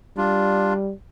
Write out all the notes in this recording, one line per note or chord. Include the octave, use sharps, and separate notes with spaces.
G3 D4 F4